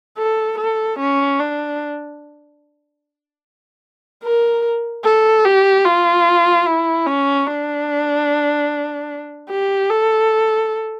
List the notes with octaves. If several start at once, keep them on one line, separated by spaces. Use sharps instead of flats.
A4
A4
C#4
D4
A#4
A4
G4
F4
E4
C#4
D4
G4
A4